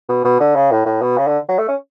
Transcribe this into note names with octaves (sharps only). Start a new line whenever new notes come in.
B2
B2
D3
C#3
A2
A2
B2
C#3
D3
F#3
A3
C#4